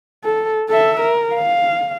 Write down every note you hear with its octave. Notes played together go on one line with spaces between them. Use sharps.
A4
A4 E5
A#4
F5